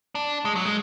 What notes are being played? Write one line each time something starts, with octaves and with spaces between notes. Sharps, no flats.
D4
G#3
F#3
G#3